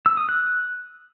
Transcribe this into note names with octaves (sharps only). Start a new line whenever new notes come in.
E6
D#6
F#6